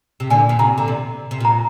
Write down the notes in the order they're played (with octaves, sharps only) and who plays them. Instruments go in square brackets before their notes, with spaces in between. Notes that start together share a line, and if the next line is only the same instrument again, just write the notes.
[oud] C3
[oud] A#2 D3 [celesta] G#5
[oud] A#2
[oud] C3 [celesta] A#5
[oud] D3
C3
C3
A#2
[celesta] A#5